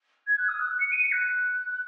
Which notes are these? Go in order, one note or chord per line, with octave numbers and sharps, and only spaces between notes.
G#6
F#6
D#6
F#6
F#6
C#7
D#7
C#7
F#6